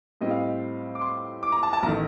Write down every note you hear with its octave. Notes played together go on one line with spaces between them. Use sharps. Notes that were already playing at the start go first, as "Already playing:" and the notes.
A2 G3 C4 D#5
F5
D#5
D6
C6
D6
A#5
A5
A5
A1 D#3 A3 A#5